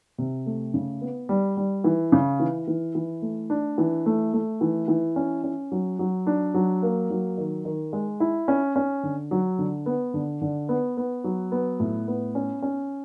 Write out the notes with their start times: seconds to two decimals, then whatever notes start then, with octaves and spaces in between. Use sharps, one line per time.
0.18 C3
0.46 A3
0.74 C#3
1.01 B3
1.29 G3
1.57 G3
1.84 E3
2.12 C#3
2.40 E3
2.67 E3
2.95 E3
3.22 A3
3.50 D4
3.78 E3
4.06 A3
4.34 A3
4.61 E3
4.88 E3
5.16 C#4
5.44 C#4
5.72 F#3
5.99 F#3
6.27 D4
6.54 F#3
6.83 A#3
7.10 F#3
7.38 D#3
7.65 D#3
7.93 G#3
8.20 E4
8.48 C#4
8.76 C#4
9.03 D3
9.31 F#3
9.59 D3
9.86 B3
10.14 D3
10.42 D3
10.69 B3
10.97 B3
11.24 F#3
11.52 B3
11.80 A2
12.08 B3
12.35 C#4
12.62 C#4